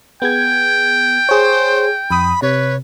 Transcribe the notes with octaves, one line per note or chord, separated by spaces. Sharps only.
B3 G#4 G5 G#6
G#4 C5 C#5
F2 B5 D#6
C3 B4 C#5